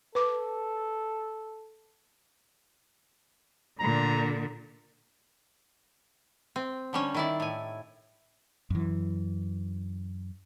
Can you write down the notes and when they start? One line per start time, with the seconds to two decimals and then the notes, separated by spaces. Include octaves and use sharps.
0.15 A4 B4 D6
3.80 A#2 D3 A#5
6.56 C4
6.93 D3 G3 C#4
7.15 D#3 E4 D5
7.40 A2 G#5
8.70 F#2 E3